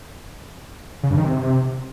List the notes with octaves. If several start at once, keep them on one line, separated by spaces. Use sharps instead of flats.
C#3
G2
D#3
C3